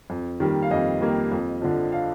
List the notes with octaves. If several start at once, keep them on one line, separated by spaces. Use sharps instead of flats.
F2
D#3 G3 A#3
F5
F2 D#5
D#3 G3 A#3
F2
D3 F3
F5